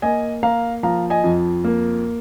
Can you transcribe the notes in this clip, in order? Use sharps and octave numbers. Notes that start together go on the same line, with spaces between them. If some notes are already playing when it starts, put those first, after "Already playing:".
A#3 D#5 G#5
A#3 F5 A#5
F3 F5 A#5
D#5 G#5
F2
A#3